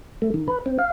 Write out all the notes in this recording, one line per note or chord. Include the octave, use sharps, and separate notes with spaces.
A3
D#3
B4
C4
F5